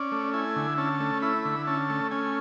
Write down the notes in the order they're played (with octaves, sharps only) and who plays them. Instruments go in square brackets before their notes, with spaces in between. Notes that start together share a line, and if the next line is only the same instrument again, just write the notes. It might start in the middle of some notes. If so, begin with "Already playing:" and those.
Already playing: [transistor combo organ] C#4 D5
A3
E4 G#5
D3
C#4 A5
A3
E4 B5
D3
C#4 A5
A3
C#4 G#5